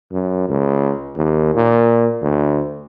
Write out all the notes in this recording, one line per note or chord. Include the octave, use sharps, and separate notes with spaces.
F#2
C#2
D#2
A#2
D2